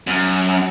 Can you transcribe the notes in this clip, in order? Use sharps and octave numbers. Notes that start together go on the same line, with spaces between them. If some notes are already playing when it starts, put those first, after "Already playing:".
F#2